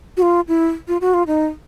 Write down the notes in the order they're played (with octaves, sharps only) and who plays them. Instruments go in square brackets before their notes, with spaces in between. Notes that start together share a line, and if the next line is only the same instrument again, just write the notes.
[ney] F#4
F4
E4
F4
F#4
F4
D#4